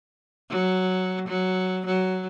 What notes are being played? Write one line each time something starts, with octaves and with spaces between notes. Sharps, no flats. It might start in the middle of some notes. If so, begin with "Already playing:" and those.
F#3
F#3
F#3